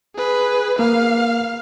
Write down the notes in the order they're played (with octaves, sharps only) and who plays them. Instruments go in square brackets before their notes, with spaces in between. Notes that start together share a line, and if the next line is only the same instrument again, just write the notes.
[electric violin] G#4 B4
[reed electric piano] A#3 [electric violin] F5